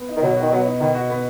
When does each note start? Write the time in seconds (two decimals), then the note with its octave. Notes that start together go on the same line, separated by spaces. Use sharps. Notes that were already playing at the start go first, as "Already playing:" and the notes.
Already playing: B3
0.09 D#4
0.16 D#3
0.22 B2 F#3
0.37 D#3 F#4
0.51 F#3 B3
0.66 D#4
0.80 B2 D#3
0.95 F#4
1.10 B3